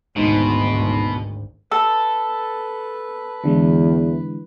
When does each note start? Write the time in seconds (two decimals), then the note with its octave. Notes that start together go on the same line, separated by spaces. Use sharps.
0.16 G#1 D2 G#2 B2
1.72 A4 B4
3.44 E2 D3 E3 G#3